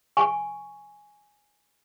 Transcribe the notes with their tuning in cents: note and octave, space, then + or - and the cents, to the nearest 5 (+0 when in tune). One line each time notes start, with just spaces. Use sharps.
G#5 +0 C#6 +0